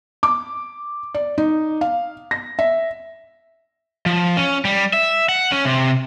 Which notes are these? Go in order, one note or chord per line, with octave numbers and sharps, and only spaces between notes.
D6
D5
D#4
F5
A#6
E5
F3
C#4
G3
E5
F#5
C#4
C3